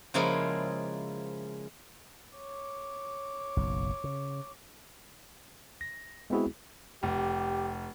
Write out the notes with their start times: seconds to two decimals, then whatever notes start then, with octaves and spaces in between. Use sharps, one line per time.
0.14 C#3 F3 G#3 A#3 C#4 E4
2.36 C#5 D6
3.57 F#1 B1
4.04 C#3
5.81 A#6
6.30 G#3 B3 C4 E4 F#4 G#4
7.03 F1 G4